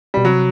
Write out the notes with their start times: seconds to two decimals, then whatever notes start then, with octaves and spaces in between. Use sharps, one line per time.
0.14 B2 G3
0.25 C3 F#3